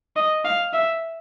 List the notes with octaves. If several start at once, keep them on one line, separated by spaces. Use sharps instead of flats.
D#5
F5
E5